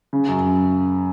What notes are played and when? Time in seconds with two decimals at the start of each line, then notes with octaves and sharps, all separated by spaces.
0.13 C#3
0.28 F#2